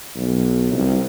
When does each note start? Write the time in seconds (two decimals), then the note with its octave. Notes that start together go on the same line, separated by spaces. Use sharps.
0.16 B1
0.72 C2